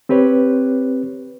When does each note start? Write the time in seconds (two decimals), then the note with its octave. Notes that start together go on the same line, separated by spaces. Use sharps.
0.09 C4 G4 B4 C#5